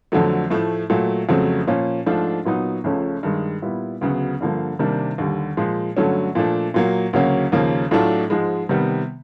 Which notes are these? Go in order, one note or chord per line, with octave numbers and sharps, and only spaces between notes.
F2 D3 F#3 A3
A2 F3 A3
A#2 F#3 A3
F2 C#3 F#3 A3 C4
A#2 F3 A#3 C#4
G#2 F3 A3 D4 F4
A#2 F#3 B3 D#4
C#2 C#3 F3 A3 C#4
G2 D#3 G#3
A#2 G3 B3 E4
D2 C#3 F#3 B3
G2 D3 F3 A#3
C3 D#3 G3 A#3 D4
D#2 D3 G3
A#2 F3 G#3
G2 D3 F#3 A3 C#4
A#2 F3 A3 D4
A#2 F#3 A#3
D2 C#3 F#3 A#3 C#4
D#2 C#3 F3 A#3 C#4
A2 F#3 A3 D4 F4
G#2 F3 G#3
C3 D#3 G3 B3